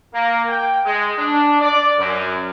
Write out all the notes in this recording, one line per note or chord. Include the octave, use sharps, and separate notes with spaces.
A#3
G5
G#3
D4
D5
F#2